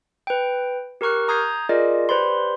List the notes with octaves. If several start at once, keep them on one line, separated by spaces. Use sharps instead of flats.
B4 G5
G4 A#4 A#5 C#6 F6 F#6
A#5 D#6 G6 G#6 C7
F4 G#4 A#4 D5 D#5
G4 B4 C5 D5 B5 C6